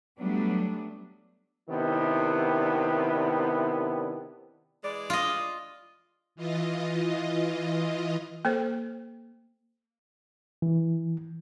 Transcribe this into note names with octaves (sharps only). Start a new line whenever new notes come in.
F#3 G3 A3 B3 D4
C3 D#3 B3 D4 E4
E3 G#3 D5
F4 D#5
E3 F4 D#5
A#3 A4 C5
E3